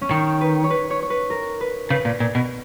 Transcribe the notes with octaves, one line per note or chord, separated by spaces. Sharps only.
C#4
D#3 D#4
B4
C#5
B4
C#5
C#5
B4
A#4
B4
C#3 B4
A#2
A#2
B2